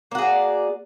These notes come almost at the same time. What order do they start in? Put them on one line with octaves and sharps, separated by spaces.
A#3 F#4 G#4 D5